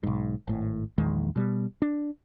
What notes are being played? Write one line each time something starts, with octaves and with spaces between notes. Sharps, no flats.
B1 G#2
G#1 A2
A#1 E2 D#3 G#3
B2 G3
D4